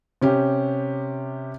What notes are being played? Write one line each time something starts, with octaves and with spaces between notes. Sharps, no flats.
C3 C#4 G4